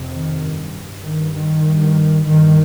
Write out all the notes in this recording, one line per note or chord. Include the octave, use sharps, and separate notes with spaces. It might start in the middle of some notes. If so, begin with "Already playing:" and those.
Already playing: F2 C3
D#3
G2
G2 D#3
D#3
G2
G2 D#3